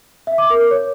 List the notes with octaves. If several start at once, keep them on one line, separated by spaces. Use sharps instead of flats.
E5
D6
A#4
C#5